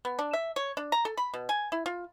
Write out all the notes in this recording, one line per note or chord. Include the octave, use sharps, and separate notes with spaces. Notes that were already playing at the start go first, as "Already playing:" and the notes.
B3
D4
E5
C#5
D4
A#5
A4
B5
B2
G#5
E4
F4